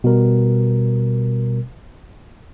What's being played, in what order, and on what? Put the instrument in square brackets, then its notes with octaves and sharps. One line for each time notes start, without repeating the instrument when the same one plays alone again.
[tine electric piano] B2 G3 A#4